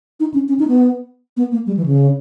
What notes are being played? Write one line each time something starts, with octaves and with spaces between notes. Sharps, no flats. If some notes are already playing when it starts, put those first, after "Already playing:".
D#4
C#4
C#4
D#4
B3
B3
A#3
G3
E3
C#3